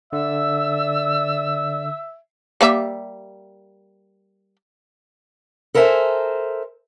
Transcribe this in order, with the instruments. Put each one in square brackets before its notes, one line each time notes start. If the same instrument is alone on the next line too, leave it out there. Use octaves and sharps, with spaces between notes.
[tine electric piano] D3 [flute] D5 [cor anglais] E5 [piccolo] E6
[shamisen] G3 A#3 E5
[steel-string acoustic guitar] A4 A#4 C5 E5 G5 G#5